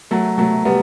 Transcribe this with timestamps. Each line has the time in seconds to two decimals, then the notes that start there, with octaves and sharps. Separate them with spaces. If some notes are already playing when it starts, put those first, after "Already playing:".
0.11 F#3 A3
0.38 F#3 A3
0.65 G3 B3